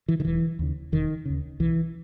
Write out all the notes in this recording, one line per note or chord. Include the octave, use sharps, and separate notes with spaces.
E3
D#3
E1 E3
D#2 C#3
E1 D#3
D#2 C#3
B1 E3